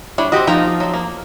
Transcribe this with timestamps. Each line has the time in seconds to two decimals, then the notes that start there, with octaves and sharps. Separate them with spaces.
0.18 G3 D4 E4 C#5
0.32 C4 F#4 G4 D#5
0.47 F3 A#3 D#4 F4 G5
0.80 F#3 C4
0.94 A#3